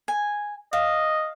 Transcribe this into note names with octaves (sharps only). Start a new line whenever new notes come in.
G#5
D#5 F5